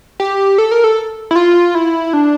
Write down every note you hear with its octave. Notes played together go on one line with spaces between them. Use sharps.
G4
A4
A#4
A4
E4
F4
E4
D4